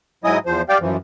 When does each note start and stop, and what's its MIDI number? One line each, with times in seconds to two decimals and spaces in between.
0.24 0.38 44
0.24 0.38 54
0.24 0.38 64
0.24 0.38 75
0.24 0.38 80
0.24 0.38 87
0.46 0.62 40
0.46 0.62 53
0.46 0.62 72
0.69 0.78 67
0.69 0.78 74
0.69 0.78 77
0.69 0.78 79
0.81 0.97 42
0.81 0.97 52
0.81 0.97 53